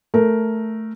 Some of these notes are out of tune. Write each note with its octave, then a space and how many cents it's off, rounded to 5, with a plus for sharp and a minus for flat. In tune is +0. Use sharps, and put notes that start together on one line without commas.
A3 +0 A#4 +0